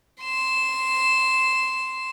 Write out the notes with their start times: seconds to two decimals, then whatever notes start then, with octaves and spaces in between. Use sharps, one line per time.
0.22 C6 E7